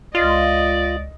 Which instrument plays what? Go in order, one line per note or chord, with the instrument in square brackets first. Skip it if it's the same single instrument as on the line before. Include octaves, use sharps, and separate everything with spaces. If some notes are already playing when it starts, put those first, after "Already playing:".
[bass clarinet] C#2 [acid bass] F4 [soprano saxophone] D5 [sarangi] D#5